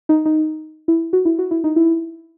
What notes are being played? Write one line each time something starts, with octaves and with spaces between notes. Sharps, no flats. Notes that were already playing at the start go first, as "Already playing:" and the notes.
D#4
D#4
E4
F#4
E4
F#4
E4
D#4
E4